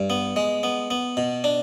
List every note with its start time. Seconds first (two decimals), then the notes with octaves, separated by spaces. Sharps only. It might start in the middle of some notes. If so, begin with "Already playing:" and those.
Already playing: G2
0.10 B3
0.36 G#3
0.63 B3
0.91 B3
1.17 B2
1.44 D4